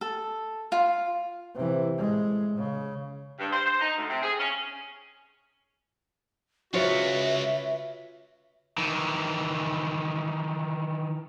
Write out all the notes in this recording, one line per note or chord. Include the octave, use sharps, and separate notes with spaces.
A4
F4
C3 E3
A2 G#3
C#3
G2
C5
C5
D#4
D2
C3
G#4
C#4
C#2 F4 F#4 B4 C#5 E5
D#3 E3